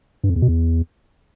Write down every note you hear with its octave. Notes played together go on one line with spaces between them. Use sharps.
G2
F2
E2
B2
E2